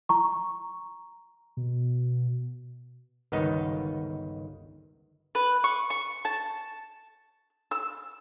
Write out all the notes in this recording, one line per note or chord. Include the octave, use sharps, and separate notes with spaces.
A#5 C#6
B2
G1 C#2 D#3 B3 D#4 D#5
B4
C#6
C#6
A5
E6